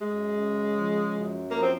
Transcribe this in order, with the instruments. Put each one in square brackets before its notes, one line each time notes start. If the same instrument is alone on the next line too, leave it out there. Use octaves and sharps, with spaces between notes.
[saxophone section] F#2 G#3
C#3
F3
F#2
F3 A#3
C4